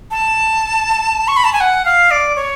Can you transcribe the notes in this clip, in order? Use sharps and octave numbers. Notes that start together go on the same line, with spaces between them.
A5
C#6
B5
A5
G#5
F#5
F5
D5
C#5